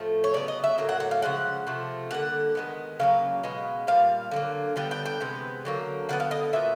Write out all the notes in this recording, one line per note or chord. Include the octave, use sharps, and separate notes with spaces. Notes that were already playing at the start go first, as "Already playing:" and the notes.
Already playing: A2 F3 A3
C#5
C#3 F#3 B3 D5
D#5
E5
A2 F#3 A#3
F#5
F#5
F5
C#3 F3 G#3 F#5
C3 F3 A3
D3 G3 A#3 F#5
D#3 G#3 B3
C#3 F#3 A#3 F5
B2 G#3 B3
A#2 G3 F5
D3 F#3 A#3
D3 G3 B3 G5
G5
G5
C3 E3 G#3 B3
D3 F#3 A#3
D3 G3 B3 F#5
F5
D#5
A#2 F#3 B3 E5